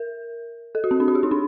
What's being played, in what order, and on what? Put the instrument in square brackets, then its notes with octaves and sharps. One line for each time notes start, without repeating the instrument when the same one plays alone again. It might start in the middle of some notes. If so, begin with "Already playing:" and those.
Already playing: [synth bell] A#4
A4
F#4
C4
D4
F#4
G4
D#4
D4